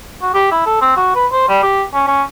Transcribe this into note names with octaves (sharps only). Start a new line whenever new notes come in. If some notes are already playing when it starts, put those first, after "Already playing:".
F#4
G4
E4
A4
C4
F#4
B4
C5
G3
G4
C#4
C#4